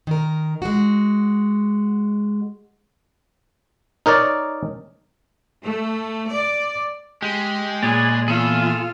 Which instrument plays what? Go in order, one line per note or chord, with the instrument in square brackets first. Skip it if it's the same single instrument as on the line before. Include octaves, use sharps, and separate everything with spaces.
[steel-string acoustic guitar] D#3 A#4
G#3 F#4
[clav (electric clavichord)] D#4 A#4 C#5 D5
[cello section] A3
D5
[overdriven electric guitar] G#3 [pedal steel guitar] G4
[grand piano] A#2 [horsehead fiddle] G#4 [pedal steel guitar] B4 C#5 D5
[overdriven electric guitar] E2 [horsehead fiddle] F4 F5 [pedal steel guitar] G#4 A4 E6